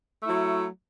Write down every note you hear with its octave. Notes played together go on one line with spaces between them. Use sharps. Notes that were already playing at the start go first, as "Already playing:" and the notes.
F#3 A3 E4